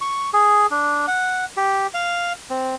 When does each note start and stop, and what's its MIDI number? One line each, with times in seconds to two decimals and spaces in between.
0.01 0.30 85
0.33 0.66 68
0.71 1.06 62
1.07 1.45 78
1.57 1.87 67
1.94 2.33 77
2.50 2.75 60